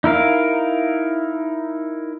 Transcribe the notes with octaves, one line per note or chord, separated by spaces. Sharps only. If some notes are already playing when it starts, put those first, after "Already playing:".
D#4 E4 A#4 F5